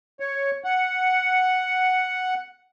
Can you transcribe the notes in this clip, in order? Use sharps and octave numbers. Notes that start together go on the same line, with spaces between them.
C#5
F#5